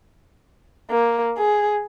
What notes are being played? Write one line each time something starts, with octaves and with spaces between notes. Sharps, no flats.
A#3
G#4